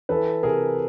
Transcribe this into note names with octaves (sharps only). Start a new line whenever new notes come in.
E3 A4 B4
C3 G#4 A#4